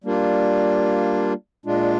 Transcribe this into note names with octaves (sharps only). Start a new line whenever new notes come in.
G3 A#3 D4 F4
A#2 G#3 D4 F4